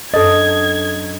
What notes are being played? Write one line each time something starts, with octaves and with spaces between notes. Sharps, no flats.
F#2 D4 A4 D#5 G#6 A6